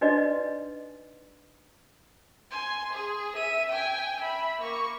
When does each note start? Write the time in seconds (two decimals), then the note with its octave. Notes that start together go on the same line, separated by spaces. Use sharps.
0.01 D4 D#4 F#4 B4 D5 D#5
2.51 G#5 C6
2.93 G#4
3.36 E5 D#7
3.70 G5 G#5
4.20 E5 B5
4.61 A#3 C#6